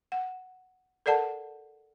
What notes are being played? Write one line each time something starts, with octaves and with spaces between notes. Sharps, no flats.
F#5
A4 A#4 D5 F#5 A5